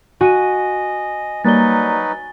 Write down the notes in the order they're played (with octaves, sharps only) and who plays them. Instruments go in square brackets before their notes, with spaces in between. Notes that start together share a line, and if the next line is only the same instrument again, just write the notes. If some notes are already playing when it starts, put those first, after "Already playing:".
[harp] F#4 D#7 [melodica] D#5 [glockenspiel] G#5
[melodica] F#3 D#4 B4 [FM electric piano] G3 A#3 D5 [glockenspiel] A6 G7